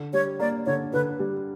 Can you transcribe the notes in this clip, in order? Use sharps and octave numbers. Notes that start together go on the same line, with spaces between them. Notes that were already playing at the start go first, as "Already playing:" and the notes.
Already playing: D3
G3 C#5
A#3 D5
D3 C#5
D3 B4
G3